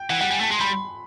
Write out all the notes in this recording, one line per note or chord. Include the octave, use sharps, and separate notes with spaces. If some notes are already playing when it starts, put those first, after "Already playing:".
Already playing: G5
E3 F#5
G3 F#5
G3 G#5
A3 A5
G#3 C6
G3 B5